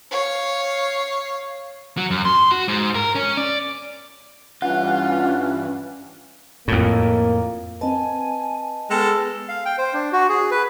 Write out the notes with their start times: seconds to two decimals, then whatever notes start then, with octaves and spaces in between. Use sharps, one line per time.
0.11 C#5 F5
1.97 F#3
2.11 F#2
2.25 C6
2.52 F#4
2.68 G#2
2.95 A#4
3.15 C#4
3.37 D5
4.62 G2 E3 C#4 F4 F#5
6.68 F2 A2 A#3
7.81 C4 B4 D#5 G#5 A5
8.91 G#3 B3 A4 G5 A5 F6
9.49 F5
9.66 G5
9.78 C5
9.94 D4
10.12 F#4
10.29 G#4
10.51 B4